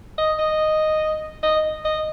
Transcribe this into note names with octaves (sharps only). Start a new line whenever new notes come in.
D#5
D#5
D#5
D#5